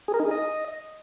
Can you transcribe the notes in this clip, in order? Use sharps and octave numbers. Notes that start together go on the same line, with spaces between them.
G#4
A#4
D#4
G#4
D#5